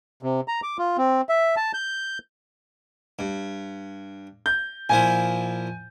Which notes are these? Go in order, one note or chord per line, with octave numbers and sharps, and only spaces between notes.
C3
A#5
D6
F4
C4
E5
A5
G6
G2
G6
A#2 F3 E4 G#5